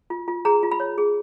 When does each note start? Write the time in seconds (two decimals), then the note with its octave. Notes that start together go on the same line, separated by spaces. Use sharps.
0.10 F4
0.28 F4
0.45 G#4 A#5
0.63 F4
0.72 B5
0.80 C#5
0.98 G#4